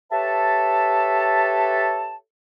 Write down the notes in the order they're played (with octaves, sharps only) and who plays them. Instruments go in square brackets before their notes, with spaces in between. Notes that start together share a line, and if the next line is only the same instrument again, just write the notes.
[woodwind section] G4 A4 B4 C#5 E5 A5